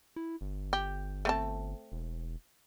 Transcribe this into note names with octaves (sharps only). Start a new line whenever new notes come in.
E4
G1
G4
A3 C4 A5
E1